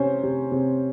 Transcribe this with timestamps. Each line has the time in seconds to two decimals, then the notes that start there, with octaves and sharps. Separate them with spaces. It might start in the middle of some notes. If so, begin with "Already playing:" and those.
Already playing: C3 C#4 C5
0.23 C3
0.52 C3